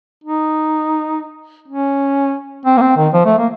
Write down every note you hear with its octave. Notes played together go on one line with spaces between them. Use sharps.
D#4
C#4
C4
A#3
C4
D#3
F3
A3
A#3